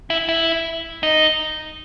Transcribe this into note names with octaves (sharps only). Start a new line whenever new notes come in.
E4
E4
D#4